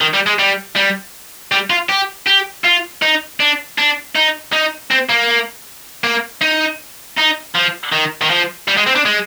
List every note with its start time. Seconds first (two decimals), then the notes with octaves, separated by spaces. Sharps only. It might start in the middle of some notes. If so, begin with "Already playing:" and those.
0.01 D#3
0.14 G3
0.26 G#3
0.39 G3
0.76 G3
1.52 G3
1.70 F4
1.89 G4
2.27 G4
2.65 F4
3.02 D#4
3.40 D4
3.78 D4
4.16 D#4
4.53 D#4
4.91 C4
5.10 A#3
6.04 A#3
6.41 D#4
7.17 D#4
7.55 F3
7.92 D#3
8.22 D#3
8.30 F3
8.68 G3
8.77 G#3
8.86 C4
8.95 D4
9.05 G#3